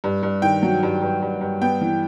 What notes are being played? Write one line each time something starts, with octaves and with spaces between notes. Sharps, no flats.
G2
G2
D#3 G5
F#3
G2
G2
G2
G2
B3 G5
E3